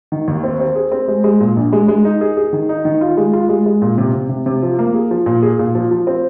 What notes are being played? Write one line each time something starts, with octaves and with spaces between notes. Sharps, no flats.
D#3
D#2
C4
C4
G#4
C4
G#3
G#3
A#2
A#1
G#3
G#3
D#4
G#4
G#4
D#3
D#4
D#3
F4
G#3
F4
G#3
G#3
A#2
C3
C3
C3
C3
F3
A#3
G#4
F3
A#2
G#4
A#2
F3
F3
C4